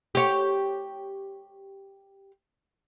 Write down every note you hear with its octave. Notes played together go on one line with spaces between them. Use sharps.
G4 C#5